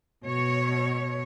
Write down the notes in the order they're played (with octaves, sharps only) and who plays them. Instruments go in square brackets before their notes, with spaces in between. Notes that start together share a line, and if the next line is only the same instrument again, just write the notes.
[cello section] B2 C#5